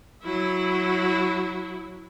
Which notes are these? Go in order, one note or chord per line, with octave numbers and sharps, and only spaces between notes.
F#3 E4